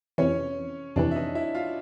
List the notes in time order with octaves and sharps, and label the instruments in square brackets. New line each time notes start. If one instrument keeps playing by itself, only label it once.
[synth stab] F2 C3 E3 [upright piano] C#4 C#5
[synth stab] F2 C3 E3 [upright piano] D4 D5
[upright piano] E5
D#4 D#5
E4 E5
F4 F5